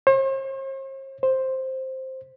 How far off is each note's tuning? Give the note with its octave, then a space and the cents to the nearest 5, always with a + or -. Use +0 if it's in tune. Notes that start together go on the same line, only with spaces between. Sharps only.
C5 +45
C5 +5